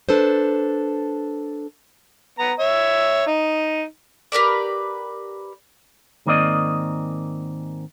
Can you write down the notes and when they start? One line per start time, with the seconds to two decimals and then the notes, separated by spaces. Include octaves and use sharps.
0.09 D4 A4 B4 C5
2.39 B3 A#5
2.60 C#5 E5
3.27 D#4
4.32 G4 A#4 B4 D5
6.26 G#2 D#3 A#3 C4 D5 D#5